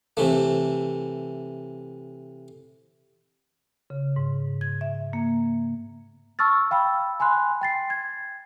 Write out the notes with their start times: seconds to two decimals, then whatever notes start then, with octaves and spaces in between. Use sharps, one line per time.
0.17 C3 E3 A3
3.90 C#3
4.16 G#2
4.61 G#6
4.81 E5
5.13 A#3
6.39 A5 C#6 E6 F6 A6
6.71 F5 G5 B5 E6
7.20 G#5 B5 C6 F#6
7.61 G5 A6 C7
7.90 G#6